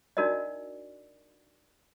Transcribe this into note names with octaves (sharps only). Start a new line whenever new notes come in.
D4 D#4 F#4 A#4 D5 D#5